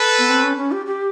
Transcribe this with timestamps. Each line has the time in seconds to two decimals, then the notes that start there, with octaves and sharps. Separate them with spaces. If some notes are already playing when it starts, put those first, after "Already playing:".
Already playing: A4 B4
0.18 B3
0.29 C4
0.43 C#4
0.57 C#4
0.71 G4
0.86 G4